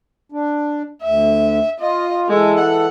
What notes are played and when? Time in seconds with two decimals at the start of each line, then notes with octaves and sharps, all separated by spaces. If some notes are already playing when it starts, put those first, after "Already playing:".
0.32 D4
1.03 D2 E5
1.80 F4 D#5
2.29 E3 G#3 A4
2.59 F#5